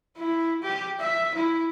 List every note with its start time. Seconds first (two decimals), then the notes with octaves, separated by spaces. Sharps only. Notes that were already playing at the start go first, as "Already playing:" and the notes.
0.17 E4
0.62 G4
0.99 E5
1.35 E4